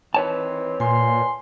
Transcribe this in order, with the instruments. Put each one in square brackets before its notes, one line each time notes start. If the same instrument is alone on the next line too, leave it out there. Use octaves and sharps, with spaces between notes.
[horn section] D#3 E3 C4 [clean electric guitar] B4 C#5 A5
[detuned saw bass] A#2 [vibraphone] G#5 [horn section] C6